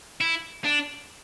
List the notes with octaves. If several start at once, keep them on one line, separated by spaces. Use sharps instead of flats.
E4
D4